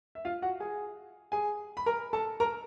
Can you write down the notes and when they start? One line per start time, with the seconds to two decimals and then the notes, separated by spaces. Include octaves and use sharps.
0.15 E5
0.25 F4 F5
0.42 F#4 F#5
0.60 G#4 G#5
1.32 G#4 G#5
1.77 B5
1.86 A#4 A#5
2.13 A4 A5
2.40 A#4 A#5